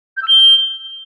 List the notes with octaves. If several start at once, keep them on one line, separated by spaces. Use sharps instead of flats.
G6
E6
G7